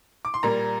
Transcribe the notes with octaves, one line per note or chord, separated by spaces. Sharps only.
D6
C6
A#2 G3 A#3 A#5